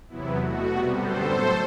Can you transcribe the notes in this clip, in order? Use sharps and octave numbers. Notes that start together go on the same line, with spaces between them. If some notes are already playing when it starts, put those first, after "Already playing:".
E2 C3 F#3 B3 E4
B2 A3 F#4
C3 G3 B3
F#2 D3 G3 B3 A4 C5
A2 F#3 A3